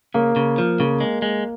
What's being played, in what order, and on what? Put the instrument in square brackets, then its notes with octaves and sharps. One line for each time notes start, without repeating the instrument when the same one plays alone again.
[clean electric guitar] C#3 [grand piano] A#3
[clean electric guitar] C#3
F3
[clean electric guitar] C#3 [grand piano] A#3
[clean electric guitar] G#3
G#3